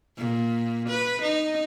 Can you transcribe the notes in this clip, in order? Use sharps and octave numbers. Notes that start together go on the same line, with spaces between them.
A#2
B4
D#4